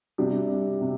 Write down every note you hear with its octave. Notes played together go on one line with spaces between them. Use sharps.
C3 G3 D4 G4
C3